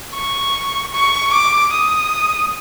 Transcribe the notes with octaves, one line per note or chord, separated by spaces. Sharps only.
C#6
C#6
D6
D#6